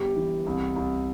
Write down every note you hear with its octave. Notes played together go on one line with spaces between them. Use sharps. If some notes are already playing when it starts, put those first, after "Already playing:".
Already playing: G1 G4
E3
C2
C2